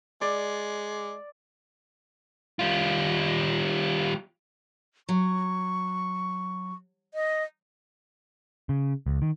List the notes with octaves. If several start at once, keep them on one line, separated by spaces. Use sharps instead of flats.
G#3 D5
G3 F4
F#3 C#6
D#5
C#3
C#2
D#3